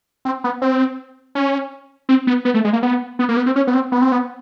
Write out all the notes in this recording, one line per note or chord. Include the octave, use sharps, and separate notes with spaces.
C4
B3
C4
C#4
C4
B3
B3
A3
G#3
A#3
B3
B3
A#3
B3
C4
C#4
B3
C4
B3
C4
B3